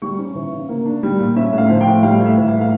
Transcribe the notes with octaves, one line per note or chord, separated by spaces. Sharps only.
G3 C#6
C#4
E3
C#3
A#3
D4
G3
A#2
C#4 E5
A2
F5
F3
G5
A2
G3 F5
A2
E5
E3
F5
A2
F5